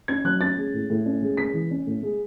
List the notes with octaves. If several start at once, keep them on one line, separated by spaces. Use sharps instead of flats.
C#4 G#6
F#3 F#6
C#4 A6
G#3
A2
A2
C#4
G#3
G#3 B6
E3
C#4
A2
G#3